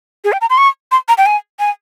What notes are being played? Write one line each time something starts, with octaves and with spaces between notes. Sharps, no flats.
G#4
G5
A#5
C6
C#6
C6
A#5
G5
G#5
G#5